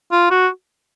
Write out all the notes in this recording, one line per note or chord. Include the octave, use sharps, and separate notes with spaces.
F4
F#4